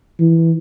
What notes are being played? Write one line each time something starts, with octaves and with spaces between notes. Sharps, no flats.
E3